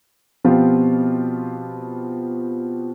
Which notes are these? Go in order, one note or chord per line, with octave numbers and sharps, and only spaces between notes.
B2 F3 B3 C4 F4 G4